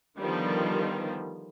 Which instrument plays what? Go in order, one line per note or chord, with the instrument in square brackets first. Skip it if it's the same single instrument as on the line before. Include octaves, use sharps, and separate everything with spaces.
[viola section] D3 D#3 F3 G3 B3